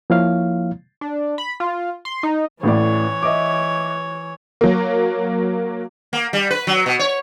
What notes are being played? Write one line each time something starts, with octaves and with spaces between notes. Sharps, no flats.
F3 A#3 E4 C#5 F5
D4
B5
F4
C6
D#4
A1 A2 E3 C#5 D5
D#5 E5 D6
F#3 A#3
A#3
G3
B4
F#3
B2
C#5